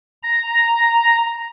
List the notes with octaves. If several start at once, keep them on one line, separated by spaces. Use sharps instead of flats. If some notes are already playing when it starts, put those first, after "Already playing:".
A#5